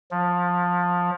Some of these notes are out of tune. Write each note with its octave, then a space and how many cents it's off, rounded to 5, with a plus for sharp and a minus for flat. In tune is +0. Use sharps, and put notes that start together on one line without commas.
F3 +20